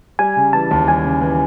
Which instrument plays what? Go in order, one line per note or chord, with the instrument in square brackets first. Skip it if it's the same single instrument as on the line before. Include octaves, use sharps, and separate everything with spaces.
[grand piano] G3 [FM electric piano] G#5
[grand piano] C#3
[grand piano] E3 [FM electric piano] A5
[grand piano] D#2
[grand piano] G3 [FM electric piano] G#5
[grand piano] C#3
E3